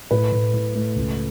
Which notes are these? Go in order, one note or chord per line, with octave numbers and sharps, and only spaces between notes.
A2 B4
A2
A2
A3
C#2